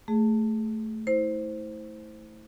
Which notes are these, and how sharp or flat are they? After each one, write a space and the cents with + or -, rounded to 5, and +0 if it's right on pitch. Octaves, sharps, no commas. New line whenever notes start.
A3 +0 G#4 +0
E4 -30 C5 +0